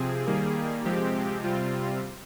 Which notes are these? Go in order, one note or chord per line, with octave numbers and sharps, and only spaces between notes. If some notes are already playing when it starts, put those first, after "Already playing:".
Already playing: C3 F3 C4 G#4
D#3 G3 A#3
C3 F3 G#3 C4 G4
C3 G3 C4 F4